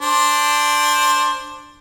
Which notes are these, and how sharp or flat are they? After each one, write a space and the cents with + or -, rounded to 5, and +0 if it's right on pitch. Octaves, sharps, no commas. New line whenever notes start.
D4 +0 C5 +15